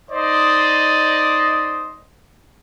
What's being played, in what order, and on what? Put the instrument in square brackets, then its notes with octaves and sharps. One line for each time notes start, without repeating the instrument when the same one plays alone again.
[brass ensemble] D#4 C5 D5 D#5